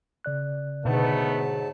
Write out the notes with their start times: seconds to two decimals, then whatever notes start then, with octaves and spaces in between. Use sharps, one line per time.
0.25 C#3 D5 F#6
0.85 G#2 B2 D3 F#3 A3 B3 D#4 A5